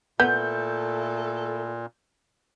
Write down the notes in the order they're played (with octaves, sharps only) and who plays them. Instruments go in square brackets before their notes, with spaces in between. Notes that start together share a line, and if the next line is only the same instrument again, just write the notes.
[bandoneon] A#2 [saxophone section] A3 E4 A4 [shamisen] B3 [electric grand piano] G6